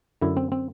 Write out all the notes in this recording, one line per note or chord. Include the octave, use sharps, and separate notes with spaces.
F#2 D3 E4
C4
C4